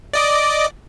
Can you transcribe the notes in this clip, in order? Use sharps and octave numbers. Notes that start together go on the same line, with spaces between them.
D5 D#5 D6